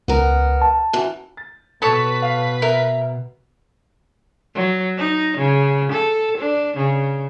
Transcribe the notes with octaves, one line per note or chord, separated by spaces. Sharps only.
C#2 B3 A#4
A5
F#2 E3
A6
B2 A4 B4 C#5 A5
F5 C7
A#4 E5
F#3
D#4
C#3
A4
D4
C#3